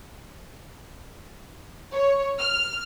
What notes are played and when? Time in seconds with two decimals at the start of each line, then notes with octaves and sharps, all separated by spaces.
1.93 C#5
2.39 F6